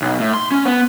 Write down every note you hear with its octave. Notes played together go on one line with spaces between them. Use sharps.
B1
A2
C6
C#4
B3